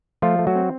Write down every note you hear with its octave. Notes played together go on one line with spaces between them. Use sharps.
F3 A3 F4
A3
F#3 F#4
C4